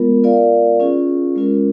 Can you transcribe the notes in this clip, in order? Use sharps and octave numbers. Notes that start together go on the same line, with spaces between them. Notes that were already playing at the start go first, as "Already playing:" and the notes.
Already playing: G#3 B3 F4 A#4
F4 A#4 D5 F5
C#4 F4 G#4
G#3 C#4 F4 A#4